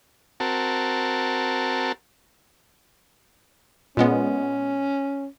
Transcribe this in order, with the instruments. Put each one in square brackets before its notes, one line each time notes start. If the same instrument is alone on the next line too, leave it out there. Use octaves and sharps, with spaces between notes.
[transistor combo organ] C4 F#4 A#4 A5
[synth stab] A#2 G#3 B3 [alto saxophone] C#4